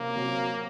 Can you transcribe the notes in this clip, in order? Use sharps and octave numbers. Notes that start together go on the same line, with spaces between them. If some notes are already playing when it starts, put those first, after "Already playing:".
Already playing: C3 F#3 A#3 C#4
C3 F#3 C#4